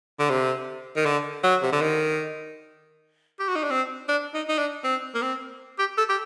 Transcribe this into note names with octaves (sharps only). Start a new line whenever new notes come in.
D3
C3
D#3
D3
F#3
C3
D3
D#3
G4
F#4
D#4
D4
C4
D4
D#4
D#4
D4
C4
A#3
C4
G4
A4
G4